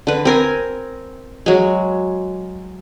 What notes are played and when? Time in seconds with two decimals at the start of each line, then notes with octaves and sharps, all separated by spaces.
0.07 D3 B4
0.25 C4 A#4 G#5
1.46 F#3 G#3